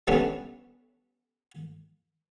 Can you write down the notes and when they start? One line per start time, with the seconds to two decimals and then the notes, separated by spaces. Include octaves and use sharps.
0.07 G3 A3 B3 C#4 D4